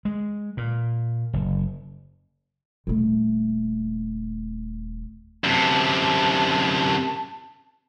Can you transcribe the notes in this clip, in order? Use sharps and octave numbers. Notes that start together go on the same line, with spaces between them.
G#3
A#2
F#1
D#1 A3
F#2 C3 A5